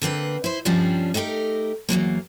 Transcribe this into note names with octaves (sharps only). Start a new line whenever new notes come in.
D3 A#3 C4 B4
E4 C5
G2 F3 G3 C#4 D4
A3 D#4 G4 A4 A#4
E2 F3 F#3 A#3